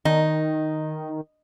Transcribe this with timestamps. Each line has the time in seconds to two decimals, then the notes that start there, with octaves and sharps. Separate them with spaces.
0.05 D#3 D#4